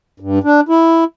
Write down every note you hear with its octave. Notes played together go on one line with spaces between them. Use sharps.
G2
D4
E4